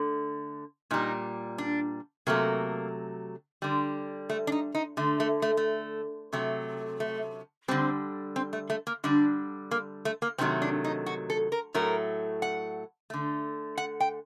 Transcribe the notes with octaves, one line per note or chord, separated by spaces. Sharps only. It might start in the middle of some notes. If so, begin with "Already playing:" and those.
Already playing: D3 A3
A#2 G3 D#4
D4
C3 F#3 A3 A#3
D3 G3
A3
D4
D#4
D#4
D3 A3
A3
A3
A3
C3 F#3 A3
A3
D3 G3 C4
C4
A3
A3
A#3
D3 G3 D4
A#3
A3
A#3
C3 D#3 F#3 A3 C4
D4
D#4
F#4
A4
A#4
A2 F#3 A3 A#4
F#5
D3 A3
F#5
G5